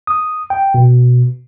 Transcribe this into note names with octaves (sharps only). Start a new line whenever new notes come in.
D#6
G5
B2